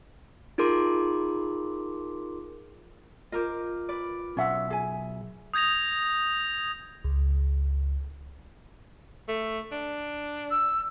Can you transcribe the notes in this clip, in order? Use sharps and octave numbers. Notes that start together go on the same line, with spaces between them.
D#4 F4 G#4 A#4 C6 D6
F4 A#4 C5 D#5 D6
B4 D5
B1 C#4 F4 E5 F#5
G#4 G#5
D#6 G6 G#6 A#6 F7
C#2
A3
D4
E6